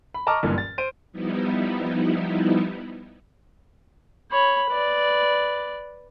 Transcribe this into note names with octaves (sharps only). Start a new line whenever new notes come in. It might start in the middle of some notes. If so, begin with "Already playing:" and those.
B5
D#5 A5 A#5 C#6 D6 F6
F#1 G2 A#2 D3 E3
A6
C5 D7 D#7
F3 G3 B3 D#4 E4
C#5 B5
B4 D5